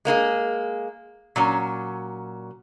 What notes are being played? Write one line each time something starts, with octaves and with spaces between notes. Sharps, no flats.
G#3 A#3 D#4 G#4
A#2 F#3 C#4